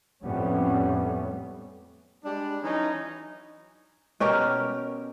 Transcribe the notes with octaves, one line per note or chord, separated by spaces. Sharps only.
F2 A2 G3 A3 B3 C#4
G3 G#3 D4
E3 F#3 C#4 D#4
B2 C#4 G4 A#4